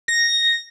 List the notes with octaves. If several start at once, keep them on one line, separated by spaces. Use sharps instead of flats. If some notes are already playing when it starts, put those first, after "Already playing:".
A#6